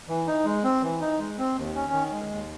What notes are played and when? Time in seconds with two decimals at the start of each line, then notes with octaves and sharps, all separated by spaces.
0.09 E3
0.27 D#4
0.45 G#3
0.64 C4
0.82 E3
1.01 D#4
1.19 G#3
1.38 C4
1.56 D#2
1.75 C#4
1.93 D#3
2.12 G#3
2.30 D#2